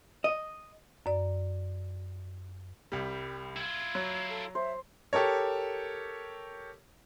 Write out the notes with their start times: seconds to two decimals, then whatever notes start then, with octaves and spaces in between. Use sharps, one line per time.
0.24 D#5
1.06 F#2 D5
2.92 C2 G3
3.57 E4 F4 G#6
3.95 F#3
4.29 A4
4.55 C5 E5
5.13 G4 A4 A#4 C#5